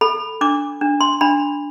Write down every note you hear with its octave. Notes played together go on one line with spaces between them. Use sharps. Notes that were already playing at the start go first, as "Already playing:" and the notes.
A4 B5
D4 D6
D4
C6
D4 B5